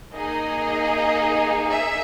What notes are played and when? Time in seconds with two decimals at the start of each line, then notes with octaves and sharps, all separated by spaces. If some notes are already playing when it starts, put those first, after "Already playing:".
0.15 A#3 D#4 G#4 D#5
1.71 E5